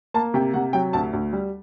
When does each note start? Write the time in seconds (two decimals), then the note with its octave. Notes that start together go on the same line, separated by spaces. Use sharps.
0.14 A#3 A5
0.34 C3 G5
0.54 C3 F#5
0.73 F#3 G5
0.93 D2 A5
1.13 D2
1.33 G3